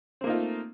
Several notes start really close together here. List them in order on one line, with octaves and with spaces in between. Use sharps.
C4 A#3 D#4 F4 A3